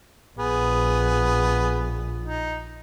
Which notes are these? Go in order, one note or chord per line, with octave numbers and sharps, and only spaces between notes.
A#1 B3 G#4
D#4